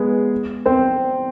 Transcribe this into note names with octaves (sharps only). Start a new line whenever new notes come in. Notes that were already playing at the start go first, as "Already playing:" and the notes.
Already playing: G#3 B3 G#4 B4
C4 C5